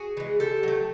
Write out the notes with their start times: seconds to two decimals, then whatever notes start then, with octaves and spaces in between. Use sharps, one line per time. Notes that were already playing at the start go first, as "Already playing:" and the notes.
Already playing: F#4 G#4
0.17 E3 G#3
0.40 D3 G4 A4
0.63 F#3 A3